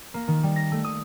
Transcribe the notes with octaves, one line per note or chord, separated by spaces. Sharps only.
A#3
D#3
G3
A#6
A3
D#6